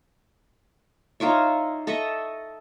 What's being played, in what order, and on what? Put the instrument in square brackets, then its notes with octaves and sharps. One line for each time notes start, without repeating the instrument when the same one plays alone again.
[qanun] D#4 F4 C#5 E5
A4 D#5 E5 C#6